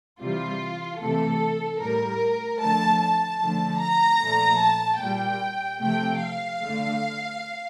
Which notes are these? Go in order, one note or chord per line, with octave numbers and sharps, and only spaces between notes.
C3 E3 G3 F4
C3 E3 A3 A4
A2 G3 A#4
D3 F3 A3 A5
A5
D3 F3 A3
A#5
A#2 F3 A3
A5
A#2 G3 G5
C3 F3 A3 G5
F5
D3 A3